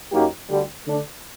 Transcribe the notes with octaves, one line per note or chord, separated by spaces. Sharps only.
F#2 F#3 A#3 D#4 G4
D2 D3 G3
D3 A3 D4